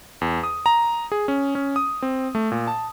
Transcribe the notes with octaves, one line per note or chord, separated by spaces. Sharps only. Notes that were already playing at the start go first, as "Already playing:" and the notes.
E2
D#6
A#5
G#4
C#4
C#4
D#6
C4
A3
A#2
A5